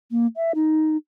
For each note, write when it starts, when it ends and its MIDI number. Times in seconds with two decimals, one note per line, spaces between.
0.11 0.26 58
0.36 0.52 76
0.55 0.97 63